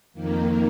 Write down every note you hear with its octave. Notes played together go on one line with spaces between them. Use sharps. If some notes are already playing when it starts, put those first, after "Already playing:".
F2 D#3 A#3